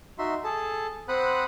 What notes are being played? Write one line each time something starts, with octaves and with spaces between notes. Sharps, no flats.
D#4 F#4 E5 C6
G#4 A4 A5
C4 C5 F#5 B5 D#6 F#6